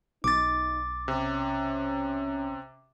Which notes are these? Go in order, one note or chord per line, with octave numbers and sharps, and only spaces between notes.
B1 D#4 D6 A6
C3 C#4